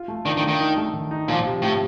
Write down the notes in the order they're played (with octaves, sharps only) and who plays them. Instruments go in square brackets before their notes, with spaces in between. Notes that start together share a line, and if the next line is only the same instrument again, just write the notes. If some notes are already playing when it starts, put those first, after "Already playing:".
Already playing: [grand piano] F4
A3
[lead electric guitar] D#3 [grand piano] D4
[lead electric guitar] D#3
[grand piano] A3
[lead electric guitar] D#3
[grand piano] D#4
A3
D#3
D#4
[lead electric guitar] A#2 [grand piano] F3
[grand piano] C3
[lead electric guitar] A2 [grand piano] C3